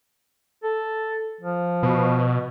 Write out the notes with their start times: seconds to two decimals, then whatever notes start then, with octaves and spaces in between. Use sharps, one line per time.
0.64 A4
1.41 F3
1.83 B2